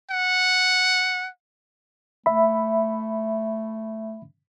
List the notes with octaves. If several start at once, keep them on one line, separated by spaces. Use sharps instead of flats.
F#5
A3 E5 B5